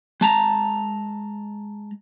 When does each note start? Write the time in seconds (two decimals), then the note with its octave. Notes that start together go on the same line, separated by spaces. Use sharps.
0.21 G#3 A5 A#5